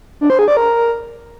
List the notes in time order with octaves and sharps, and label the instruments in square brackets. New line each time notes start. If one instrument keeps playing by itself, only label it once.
[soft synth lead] D4
C5
G#4
D5
A#4